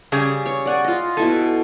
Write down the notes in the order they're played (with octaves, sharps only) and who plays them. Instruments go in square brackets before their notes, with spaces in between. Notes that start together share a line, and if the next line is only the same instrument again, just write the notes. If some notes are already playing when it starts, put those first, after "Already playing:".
[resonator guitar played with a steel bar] C#3 G3 G#4
[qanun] C#5
D5 F#5 G#5
F4 D#5
[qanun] B2 E4 G#5 [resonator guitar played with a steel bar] A4